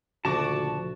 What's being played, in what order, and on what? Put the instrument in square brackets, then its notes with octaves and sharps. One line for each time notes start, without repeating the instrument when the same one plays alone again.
[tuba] D2 [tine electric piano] A#2 C#3 F3 [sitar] F#4 [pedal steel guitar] A5 D6